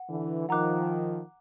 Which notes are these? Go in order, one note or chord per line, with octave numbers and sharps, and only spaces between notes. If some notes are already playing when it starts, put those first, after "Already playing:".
Already playing: F#5
D3 E3
D#3 F3 F#5 A#5 D6 F#6